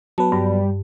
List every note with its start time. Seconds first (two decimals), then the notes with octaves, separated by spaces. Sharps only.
0.18 F#3 B3 B4 A5
0.32 G2 G3